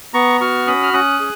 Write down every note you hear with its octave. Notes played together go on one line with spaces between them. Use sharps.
B3 A#5 C#6
F#4 C#6 F6
C#4 B5 D#6
F6
C#4 D#6 F#6
G#4